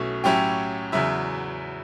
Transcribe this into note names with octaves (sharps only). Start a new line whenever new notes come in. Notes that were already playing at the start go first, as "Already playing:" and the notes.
Already playing: B1 B2 A3 C#4 E4 C#5
A2 F#3 C#4 E4 G4 G5
E2 C#3 F#3 E4 E5